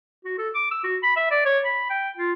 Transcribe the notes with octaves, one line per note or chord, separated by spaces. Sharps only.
F#4
A4
D6
E6
F#4
B5
E5
D5
C#5
B5
G5
F4